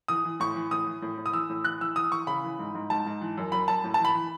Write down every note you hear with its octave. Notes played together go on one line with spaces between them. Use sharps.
E3 D#6
E3
A2 C#6
E3
A2 D#6
E3
A2
A2
D#6
E3 E6
A2
E3 F#6
E3 E6
E3 D#6
E3 C#6
C#3 B5
E3
G#2
G#2
G#2 A5
G#2
E3
F#2
F#2 B5
F#2 A5
A2
A5
E3 B5
E3